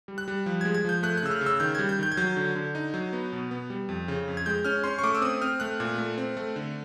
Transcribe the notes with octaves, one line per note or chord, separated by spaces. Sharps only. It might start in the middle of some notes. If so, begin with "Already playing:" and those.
G3
F#6
G3
F3
G#3 G#6
G#6
F3 G6
A3 F#6
F#6
C#3 E6
F6
C#3
E6
D#3 G6
G3 G#6
G6
D#3 G6
G#6
F#3 G6
D3
D3
D#4
F#3
B3
B2
B3
G3
F2
C#3
F2
G#6
G#3 G6
C#4 F6
C#4 C6
C#6
A3 D6
E6
C4 D#6
C4 F6
A3 F#6
A#2
A3
C4
A3
D3